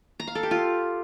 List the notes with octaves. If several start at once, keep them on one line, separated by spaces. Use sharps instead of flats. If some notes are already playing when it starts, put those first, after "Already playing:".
A#5
F5
A4
G4
F4